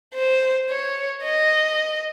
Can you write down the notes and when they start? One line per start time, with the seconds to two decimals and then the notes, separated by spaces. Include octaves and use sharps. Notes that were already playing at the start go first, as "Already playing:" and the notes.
0.14 C5
0.69 C#5
1.23 D#5